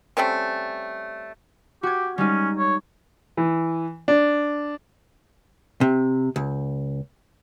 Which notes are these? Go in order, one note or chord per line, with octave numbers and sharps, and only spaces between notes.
G3 A3 C4 C#4
F#4 G4 G#6
G3 G#3 C#4 D#4
C#5
E3
D4
C3
C#2